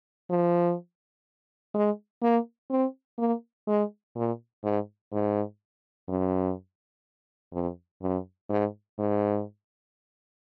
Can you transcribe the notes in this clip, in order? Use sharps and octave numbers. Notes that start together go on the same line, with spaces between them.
F3
G#3
A#3
C4
A#3
G#3
A#2
G#2
G#2
F#2
F2
F#2
G#2
G#2